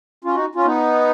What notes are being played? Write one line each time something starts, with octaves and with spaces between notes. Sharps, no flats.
C#4 F4
D#4 F#4
C#4 F4
B3 D#4